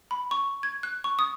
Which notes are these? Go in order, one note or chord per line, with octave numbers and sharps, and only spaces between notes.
B5
C#6
G#6
F#6
C#6
D#6